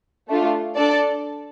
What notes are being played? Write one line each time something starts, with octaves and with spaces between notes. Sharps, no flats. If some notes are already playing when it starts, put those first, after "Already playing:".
A3 D4 F4
D4 A4 D5 A5